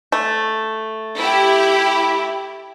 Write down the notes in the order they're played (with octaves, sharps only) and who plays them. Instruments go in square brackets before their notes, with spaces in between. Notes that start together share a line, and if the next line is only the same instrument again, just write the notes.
[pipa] A3
[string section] E4 G4